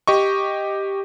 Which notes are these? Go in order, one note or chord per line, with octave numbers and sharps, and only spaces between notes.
G4 D#5 C#6